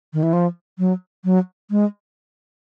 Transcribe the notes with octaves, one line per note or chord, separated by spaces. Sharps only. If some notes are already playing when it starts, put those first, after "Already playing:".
D#3
E3
F3
F#3
F#3
G#3